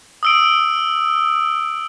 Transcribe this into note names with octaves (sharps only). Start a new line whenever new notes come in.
D#6 E6 D7